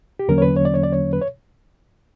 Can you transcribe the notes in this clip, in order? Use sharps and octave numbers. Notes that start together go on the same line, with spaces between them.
G4
E2 D3 F#3 A#3 C#4 A#4
C#5
B4
C#5
D5
C#5
D5
C#5
B4
C#5